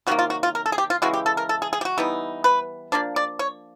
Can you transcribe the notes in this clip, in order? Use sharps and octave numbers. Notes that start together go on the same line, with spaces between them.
C3 D#3 F#3 A#3 F#4
F4
F#4
F4
A#4
A4
G#4
G4
F4
C#3 E3 G#3 F#4
G4
A4
A#4
A4
G#4
G#4
G4
F#4
E3 G3 B3 D#4
B4
F3 A#3 D4 D5
D5
C#5